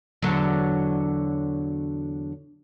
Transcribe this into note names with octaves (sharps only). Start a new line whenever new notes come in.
E2 D3 F#3